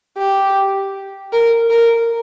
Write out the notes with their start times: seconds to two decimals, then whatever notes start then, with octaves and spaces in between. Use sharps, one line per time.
0.18 G4
1.33 A#4
1.71 A#4